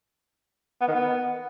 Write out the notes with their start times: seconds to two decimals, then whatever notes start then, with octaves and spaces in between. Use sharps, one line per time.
0.81 B3
0.88 D#3
0.95 B3